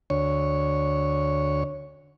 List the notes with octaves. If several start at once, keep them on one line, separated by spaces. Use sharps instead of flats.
D2 C#5